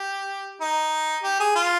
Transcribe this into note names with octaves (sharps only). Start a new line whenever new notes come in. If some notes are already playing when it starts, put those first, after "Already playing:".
Already playing: G4
D#4
G4
G#4
F4